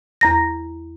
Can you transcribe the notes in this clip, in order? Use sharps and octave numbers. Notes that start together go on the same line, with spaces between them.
E2 A#5 A#6